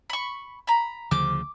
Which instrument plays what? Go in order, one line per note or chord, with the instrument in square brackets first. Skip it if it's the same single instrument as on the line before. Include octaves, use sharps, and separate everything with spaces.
[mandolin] B5 C#6
A#5 B5
[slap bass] D2 C#3 F3 [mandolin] D6